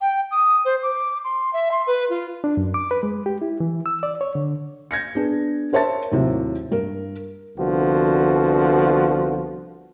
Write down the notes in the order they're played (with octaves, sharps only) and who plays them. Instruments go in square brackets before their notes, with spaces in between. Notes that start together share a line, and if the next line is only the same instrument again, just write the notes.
[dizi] G5
D#6
C5
D6
C6
E5
C6
B4
F4
[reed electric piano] D4
F#2
D6
B4
G#3
G4
E4
E3
E6
D5
C#5
D3
[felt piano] G6 G#6 A#6 C#7
B3 D4 G#4
A#4 C5 C#5 E5 A5 A6
D#2 A2 C3 F#3
G2 A#4
[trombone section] C2 D3 F3 B3 F#4